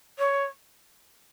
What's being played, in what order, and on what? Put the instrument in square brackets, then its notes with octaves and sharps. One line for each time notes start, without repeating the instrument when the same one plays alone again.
[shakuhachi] C#5